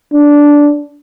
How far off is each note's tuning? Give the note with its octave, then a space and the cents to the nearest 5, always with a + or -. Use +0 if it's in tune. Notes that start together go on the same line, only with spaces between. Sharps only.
D4 -10